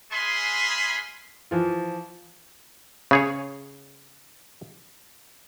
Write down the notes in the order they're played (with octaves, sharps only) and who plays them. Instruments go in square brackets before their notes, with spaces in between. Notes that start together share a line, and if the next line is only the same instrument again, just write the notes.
[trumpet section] G#3 G#4 F5 G#5 B5 C6
[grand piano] E3 F3 F4
[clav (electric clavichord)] C#3 G#4 C#5